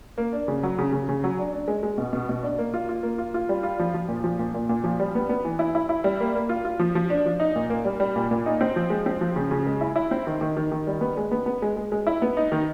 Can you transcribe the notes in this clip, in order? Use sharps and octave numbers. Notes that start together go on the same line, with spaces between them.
A#3
D4
C#3
F#3
C#3
C#3
C#3
F#3
D4
D4
G#3
G#3
B2
B2
B2
D4
A#3
F4
F4
A#3
F4
F4
G3
F4
F3
F3
A#2
F3
A#2
A#2
A#2
F3
G3
B3
B3
E3
E4
E4
E4
G3
A#3
A#3
F4
F4
F3
F3
D4
F3
D#4
A#2
A#3
G3
G3
A#2
A#2
D#4
C4
F3
G#3
C4
F3
C#3
C#3
G#3
E4
E4
C4
D#3
D#3
D#3
D#3
G3
B3
G#3
B3
B3
G#3
G#3
G#3
E4
B3
D#4
D#3